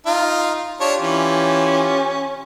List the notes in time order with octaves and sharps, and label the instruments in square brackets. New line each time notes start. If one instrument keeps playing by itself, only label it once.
[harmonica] D#4 F4
[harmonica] D4 C#5 [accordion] F4 G4
[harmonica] E3 [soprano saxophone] C#4